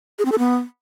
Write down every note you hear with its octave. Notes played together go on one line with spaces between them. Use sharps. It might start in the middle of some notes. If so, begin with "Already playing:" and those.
G#4
C4
A4
B3